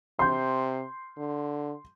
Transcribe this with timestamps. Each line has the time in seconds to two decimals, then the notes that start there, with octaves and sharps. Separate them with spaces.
0.19 C3 C6 G6
1.17 D3